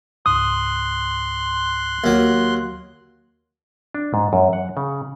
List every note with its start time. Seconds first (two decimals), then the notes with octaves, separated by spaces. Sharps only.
0.26 C#2 G#2 C6 D#6 F#6
2.04 D#2 F#3
3.94 D4
4.14 G#2
4.33 F#2
4.53 F#5
4.77 C#3